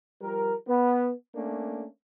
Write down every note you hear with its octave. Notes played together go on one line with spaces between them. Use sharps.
F3 G3 A#4
B3
A3 A#3 C#4 D4